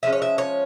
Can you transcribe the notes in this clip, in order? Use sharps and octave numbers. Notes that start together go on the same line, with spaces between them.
F3 G#3 C#4 E5
C#5
E5
C#5